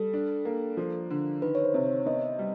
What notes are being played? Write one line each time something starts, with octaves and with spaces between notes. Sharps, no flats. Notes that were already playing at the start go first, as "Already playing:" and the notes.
Already playing: G3 A4
D4
A#3
F3
D3
D#3 B4
C#5
C5
C3
C#5
B3 D#5
G3